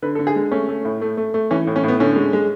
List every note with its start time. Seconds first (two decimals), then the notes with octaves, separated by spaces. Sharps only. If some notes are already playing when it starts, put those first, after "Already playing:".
0.02 D3 B4
0.15 A4
0.19 D3
0.27 G#4
0.36 G#3
0.52 A3 C#4
0.69 A3
0.85 A2
1.01 A3
1.17 A3
1.34 A3
1.51 E3 C#4
1.67 A2
1.76 C#4
1.84 A2 B3
2.00 D3 C#4
2.16 G#3
2.33 G#3